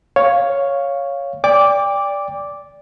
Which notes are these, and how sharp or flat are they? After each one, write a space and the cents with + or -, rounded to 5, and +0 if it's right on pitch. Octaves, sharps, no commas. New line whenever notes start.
C#5 +0 F5 +0
D5 -10 G5 +30 D6 -5